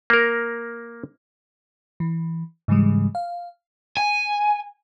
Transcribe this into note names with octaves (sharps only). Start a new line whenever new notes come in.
A#3 A#4
E3
G#2 C#3 E3 G3 G#3
F5
G#5